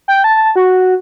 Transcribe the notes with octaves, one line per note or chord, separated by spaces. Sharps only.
G5
A5
F#4